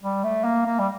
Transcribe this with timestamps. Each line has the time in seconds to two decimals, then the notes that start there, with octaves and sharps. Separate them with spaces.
0.02 G3
0.24 A3
0.44 A#3
0.66 A#3
0.79 G3